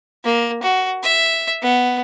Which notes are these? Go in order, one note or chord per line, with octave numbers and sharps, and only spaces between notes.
A#3
F#4
E5
B3